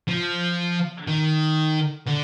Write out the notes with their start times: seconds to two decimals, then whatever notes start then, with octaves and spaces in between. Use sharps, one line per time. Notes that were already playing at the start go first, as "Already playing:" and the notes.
0.08 F3
1.08 D#3
2.07 D3